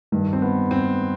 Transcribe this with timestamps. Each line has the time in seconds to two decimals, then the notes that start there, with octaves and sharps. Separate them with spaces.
0.12 G2 D#3
0.33 C4
0.42 B3
0.71 C4